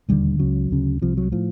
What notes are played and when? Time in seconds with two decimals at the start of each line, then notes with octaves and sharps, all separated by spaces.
0.09 E1 D#2 D3 G3
0.39 C#2 C#3 F#3
0.71 D2 C#3
1.02 C2 C3 F3
1.17 F#3
1.32 A2 F3